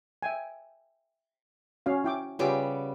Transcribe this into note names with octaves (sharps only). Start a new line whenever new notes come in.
E5 G5 G#5
C#4 F#4 F5
E4 G5 D6
C#3 G3 B3 F4 G4